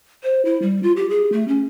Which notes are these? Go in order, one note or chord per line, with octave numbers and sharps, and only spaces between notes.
C5
E4
G3
F4
G4
G#4
A3
C#4